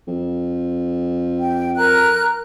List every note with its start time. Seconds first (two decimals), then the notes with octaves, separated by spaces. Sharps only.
0.07 F2
1.37 G5
1.77 A#4 A#5 F#6